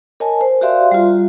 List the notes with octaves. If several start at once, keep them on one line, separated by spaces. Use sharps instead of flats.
A#4 C#5 D#5 G#5 A5
C5
F#4 G4 D5 E5 F5 C6
G3 F4